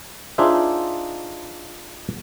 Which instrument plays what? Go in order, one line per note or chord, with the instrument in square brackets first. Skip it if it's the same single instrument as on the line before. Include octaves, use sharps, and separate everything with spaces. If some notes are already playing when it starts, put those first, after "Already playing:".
[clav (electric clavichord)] D4 D#4 F4 G#4 C5 E5